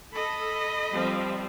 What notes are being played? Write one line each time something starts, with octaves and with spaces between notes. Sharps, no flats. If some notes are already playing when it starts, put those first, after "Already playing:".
A4 D#5 B5
F3 G3 C4